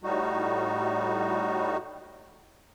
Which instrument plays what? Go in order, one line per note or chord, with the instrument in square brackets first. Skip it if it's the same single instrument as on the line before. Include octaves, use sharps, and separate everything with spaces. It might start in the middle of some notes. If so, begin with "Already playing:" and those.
[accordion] A2 G3 D#4 F#4